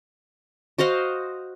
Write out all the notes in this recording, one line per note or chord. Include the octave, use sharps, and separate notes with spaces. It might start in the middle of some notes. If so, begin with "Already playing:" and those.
F#4 C5 D#5 F5